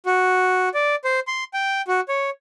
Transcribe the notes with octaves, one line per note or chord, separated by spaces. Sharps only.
F#4
D5
C5
C6
G5
F#4
C#5